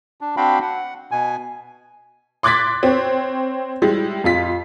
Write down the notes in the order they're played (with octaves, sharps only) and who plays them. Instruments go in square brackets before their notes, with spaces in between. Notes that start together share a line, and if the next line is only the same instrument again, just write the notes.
[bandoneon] D4
C4 D4 F#4 F5 G5 B5
F#5
B2 G#5
[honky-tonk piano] C6 D6 F#6 G#6 A6 B6
C4 C#5
G3 G#3 E4 G4
F2 F4 B6